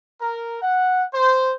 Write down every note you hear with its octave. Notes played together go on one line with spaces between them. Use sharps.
A#4
F#5
C5